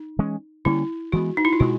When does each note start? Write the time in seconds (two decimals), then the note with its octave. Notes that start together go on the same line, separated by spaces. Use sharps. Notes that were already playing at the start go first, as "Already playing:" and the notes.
Already playing: D#4
0.19 E3 G#3 C#4
0.65 D3 G3 A#3 C#4 E4
1.12 E3 G#3 B3 F#4
1.37 D#4
1.45 E4
1.53 F4
1.60 B2 G#3 F#4